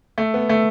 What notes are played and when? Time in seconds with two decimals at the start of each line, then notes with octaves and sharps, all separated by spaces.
0.18 A3
0.34 B3
0.49 A3